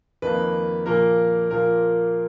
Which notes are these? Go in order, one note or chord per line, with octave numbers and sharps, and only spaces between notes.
F2 D#3 A#3 B4
A#2 F3 A#3 A#4
A#2 F3 A#3 A#4